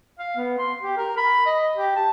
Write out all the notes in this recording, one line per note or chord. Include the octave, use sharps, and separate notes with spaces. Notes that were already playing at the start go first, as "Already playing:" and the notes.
F5
B3
C6
G4
A#4
B5
D#5
G4
A5